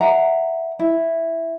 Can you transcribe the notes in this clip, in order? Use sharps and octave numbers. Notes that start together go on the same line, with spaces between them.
E5 F#5 A#5
E4